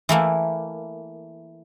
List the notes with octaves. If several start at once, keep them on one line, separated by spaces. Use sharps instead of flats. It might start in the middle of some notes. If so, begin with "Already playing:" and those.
E3 A3 A#3